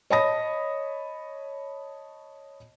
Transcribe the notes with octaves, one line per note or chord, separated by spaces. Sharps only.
C#5 D#5 A5 B5 D#6 A#6